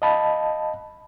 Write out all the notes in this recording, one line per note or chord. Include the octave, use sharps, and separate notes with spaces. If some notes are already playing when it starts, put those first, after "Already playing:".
D#5 F5 A5 B5